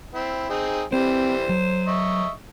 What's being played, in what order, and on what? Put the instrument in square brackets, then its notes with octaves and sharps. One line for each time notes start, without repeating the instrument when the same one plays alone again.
[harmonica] C4 E4
C4 D#4 G#4
[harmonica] E3 G3 [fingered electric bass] C4 [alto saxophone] C5
[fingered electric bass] F#3
[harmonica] D#5 E5 C#6